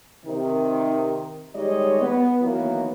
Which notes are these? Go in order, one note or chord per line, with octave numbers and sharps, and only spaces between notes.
C3 D#3
D#3 G3 G#3 C#5 D#5
B3
D#3 E3 F#3 A#3 B3